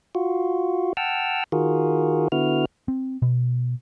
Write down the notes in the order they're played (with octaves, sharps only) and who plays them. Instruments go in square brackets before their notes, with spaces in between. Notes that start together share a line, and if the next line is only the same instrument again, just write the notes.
[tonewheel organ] F4 F#4
F#5 G5 A5 E6 F6
D#3 F4 F#4 G#4 A#4
D3 B3 E4 F#4 F6
[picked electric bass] C4
B2